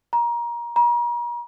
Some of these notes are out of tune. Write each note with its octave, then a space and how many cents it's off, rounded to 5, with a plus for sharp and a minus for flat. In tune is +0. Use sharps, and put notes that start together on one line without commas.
A#5 +25
A#5 +40